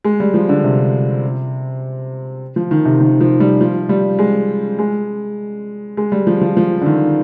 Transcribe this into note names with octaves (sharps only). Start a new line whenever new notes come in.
G#3
G3
F3
D3
C3
F3
D#3
C3
D#3
F3
G3
F3
G3
G#3
G#3
G#3
G3
F3
F3
F3
D3
D#3